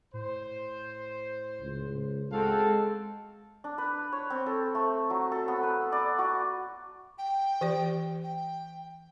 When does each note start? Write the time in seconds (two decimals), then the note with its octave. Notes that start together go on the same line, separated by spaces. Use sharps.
0.14 A2 C5
1.62 C#2
2.32 G#3 C4 F#4 A4 F5
3.64 D4
3.78 B4
4.12 C#5
4.30 C4
4.46 A4
4.75 A3
5.10 F#3
5.32 A4
5.48 B3
5.63 B4
5.92 D5
6.19 F#4
7.18 G5
7.61 E3 G4 D5
8.23 G5